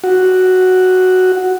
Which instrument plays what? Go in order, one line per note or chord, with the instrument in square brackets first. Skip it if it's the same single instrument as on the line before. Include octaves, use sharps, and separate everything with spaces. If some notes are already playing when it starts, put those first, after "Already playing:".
[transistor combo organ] F#4